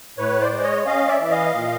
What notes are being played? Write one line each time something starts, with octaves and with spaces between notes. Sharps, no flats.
A2 B4 C#5
C5 D5
G#3
C#5 D#5
C#4 D#5 F5
D5 E5
E3
D#5 F5
A#2